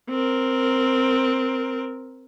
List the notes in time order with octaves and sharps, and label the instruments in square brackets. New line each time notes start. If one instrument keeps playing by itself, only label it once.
[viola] C4 A#4